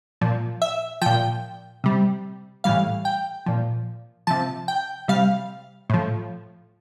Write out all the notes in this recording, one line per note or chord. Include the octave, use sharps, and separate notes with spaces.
A#2 F3
E5
A#2 F3 G5
C3 G3
A2 E3 G3 F5
G5
A#2 F3
C3 F3 A5
G5
C3 G3 F5
A2 F3